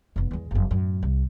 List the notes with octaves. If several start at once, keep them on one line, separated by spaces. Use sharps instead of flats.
F1 B3
E2 G#3
F#1 F2
F#2 A2
C2